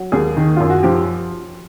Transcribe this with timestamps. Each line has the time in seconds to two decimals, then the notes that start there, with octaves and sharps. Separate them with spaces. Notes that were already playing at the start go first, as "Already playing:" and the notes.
Already playing: F#3
0.12 D#2 G#4
0.37 D#3
0.56 F#2 F4
0.70 F#4
0.83 F3 G4